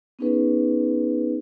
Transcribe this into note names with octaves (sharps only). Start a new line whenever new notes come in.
B3 C#4 D#4 G#4 B4